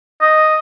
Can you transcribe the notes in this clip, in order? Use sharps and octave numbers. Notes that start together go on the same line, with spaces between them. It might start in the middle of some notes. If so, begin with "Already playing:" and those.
D#5